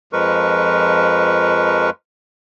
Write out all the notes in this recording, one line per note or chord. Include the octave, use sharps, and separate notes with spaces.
F2 F3 G#3 A#4 B4 C#6